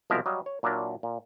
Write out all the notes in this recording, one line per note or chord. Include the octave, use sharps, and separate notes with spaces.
C2 B2 F3 G#3 A#4 E5
F#3 G3 D#5 F5
C#5
A#2 F#3 D4 E4 A#4
A#2